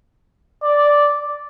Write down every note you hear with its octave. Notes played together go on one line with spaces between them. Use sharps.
D5